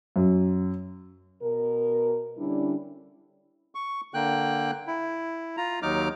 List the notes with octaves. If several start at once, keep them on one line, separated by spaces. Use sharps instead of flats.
F#2
B2 A#4
D3 G3 C#4 D4 E4
C#6
D3 A#3 G5 F#6
E4
F4 A#5
D#2 F#3 D#4 D6 F6